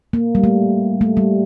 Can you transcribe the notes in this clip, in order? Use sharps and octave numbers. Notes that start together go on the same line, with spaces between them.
A#3
G3
A3
A3
G3